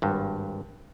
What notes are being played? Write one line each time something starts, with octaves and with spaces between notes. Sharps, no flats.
G#1 G2